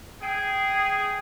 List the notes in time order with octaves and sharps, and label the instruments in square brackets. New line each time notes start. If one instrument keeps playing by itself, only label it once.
[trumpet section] G#4 [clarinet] G5